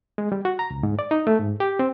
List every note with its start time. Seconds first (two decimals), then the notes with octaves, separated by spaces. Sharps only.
0.18 G#3
0.32 G3
0.45 F#4
0.59 A#5
0.70 C#2
0.83 G#2
0.99 D5
1.11 D#4
1.27 A3
1.39 G#2
1.60 G4
1.79 C4